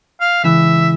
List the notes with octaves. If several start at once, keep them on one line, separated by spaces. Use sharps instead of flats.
F5
C#2 E3 E5